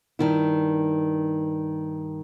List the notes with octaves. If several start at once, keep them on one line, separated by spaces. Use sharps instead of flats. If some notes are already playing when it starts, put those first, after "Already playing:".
G2 D#3 E4